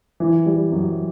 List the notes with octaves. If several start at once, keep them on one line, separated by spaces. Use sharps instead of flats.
E3
G3
F#2